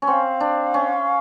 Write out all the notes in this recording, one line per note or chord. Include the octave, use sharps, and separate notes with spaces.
C#4
C4 F#5
F5
D4
C#4